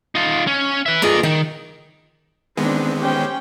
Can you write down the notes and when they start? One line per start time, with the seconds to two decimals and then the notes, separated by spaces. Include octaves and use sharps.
0.15 D#4 F4
0.47 C#4
0.86 B4 E5
1.02 G2 A#3 F4 G#4 D#5
1.23 D#3 D#4
2.57 D#3 G#3 B3 C4 D4
2.99 C#4 G4 C5 G5